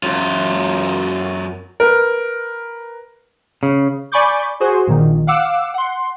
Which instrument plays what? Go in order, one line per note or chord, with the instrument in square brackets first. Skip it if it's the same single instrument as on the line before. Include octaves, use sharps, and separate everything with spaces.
[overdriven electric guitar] F#2 F4
[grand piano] A#4 B4
[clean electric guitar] C#3
[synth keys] D5 G#5 B5 C#6 D6 G6
F#4 G#4 C5
A#1 A#2 D#3
F5 F#5 D6 E6
F#5 C6